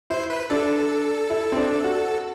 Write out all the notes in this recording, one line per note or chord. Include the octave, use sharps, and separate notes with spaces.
E4 C5
B4
D4 A4
E4
C4
D4
F#4